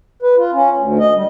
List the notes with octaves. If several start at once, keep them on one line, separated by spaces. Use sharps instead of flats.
B4
F4
C#4
D2
D#5
G3